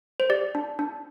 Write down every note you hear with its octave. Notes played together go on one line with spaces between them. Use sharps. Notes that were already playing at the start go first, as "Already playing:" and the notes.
C5
G4 D5
D4
D4